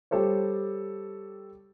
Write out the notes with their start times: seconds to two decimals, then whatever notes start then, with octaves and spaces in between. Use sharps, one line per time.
0.11 G3 G4 A4 C5 C#5